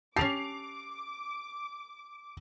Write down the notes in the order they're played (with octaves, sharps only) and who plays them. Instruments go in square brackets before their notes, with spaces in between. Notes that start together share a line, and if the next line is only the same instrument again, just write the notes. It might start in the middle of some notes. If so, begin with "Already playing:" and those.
[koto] C#4 G4 [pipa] A5 [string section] D6 [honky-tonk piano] C7 F7